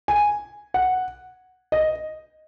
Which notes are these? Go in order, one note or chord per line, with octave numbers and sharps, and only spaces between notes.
G#5
F#5
D#5